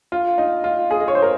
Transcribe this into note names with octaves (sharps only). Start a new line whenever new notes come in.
F4
D#4
F4
G#4
D#5
C#5
C5
A#4